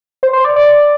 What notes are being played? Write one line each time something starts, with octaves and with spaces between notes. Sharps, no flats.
C5
C5
D5
D5